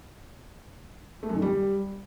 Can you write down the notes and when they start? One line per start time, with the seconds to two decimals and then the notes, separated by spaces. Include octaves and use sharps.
1.23 A3
1.29 F#2
1.36 D#3
1.42 G3